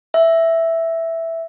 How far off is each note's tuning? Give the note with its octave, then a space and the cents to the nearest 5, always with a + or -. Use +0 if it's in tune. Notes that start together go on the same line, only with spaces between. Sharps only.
E5 +0